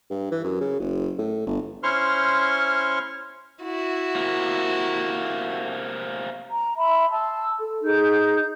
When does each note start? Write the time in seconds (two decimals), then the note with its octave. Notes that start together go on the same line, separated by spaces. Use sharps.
0.10 G2
0.31 E3
0.44 F#2
0.60 C#3
0.80 F#1
1.18 A2
1.46 G1
1.83 C#4 E4 C5 C6 C#6 F6
3.62 E4 F#4
4.16 C3 A#3
6.49 A#5
6.77 E5 B5 C6
7.09 A5 C6 E6
7.58 A4
7.82 D#4 G#4 G6